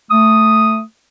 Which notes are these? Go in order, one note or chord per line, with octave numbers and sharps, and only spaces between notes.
A3 D#6